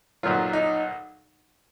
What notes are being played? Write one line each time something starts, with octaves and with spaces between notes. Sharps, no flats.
B1 A#2 F#3 F4
D#4